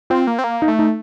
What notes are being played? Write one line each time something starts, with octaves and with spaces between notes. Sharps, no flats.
C4 F4
A#3
C4
A#3
D#4
A3
D#4